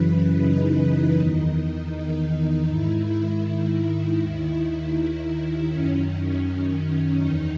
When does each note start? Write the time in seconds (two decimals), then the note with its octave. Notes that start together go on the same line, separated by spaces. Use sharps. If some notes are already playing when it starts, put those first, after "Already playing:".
Already playing: F#2 C#3 E3 B4
0.42 D#4
1.17 E2 D#3
1.92 D#4
2.67 G#2 D#3 E4
4.18 D#2 D#3 E4
5.68 F#2 D#3 C#4
7.19 E2 D#3 D#4